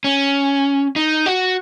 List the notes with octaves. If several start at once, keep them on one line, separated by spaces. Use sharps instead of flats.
C#4
D#4
F#4